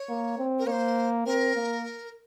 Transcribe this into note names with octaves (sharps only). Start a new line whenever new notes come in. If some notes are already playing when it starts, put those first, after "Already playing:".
Already playing: C#5
A#3
C4
A#4
A#3 C#5
C5
C4 A#4
A#3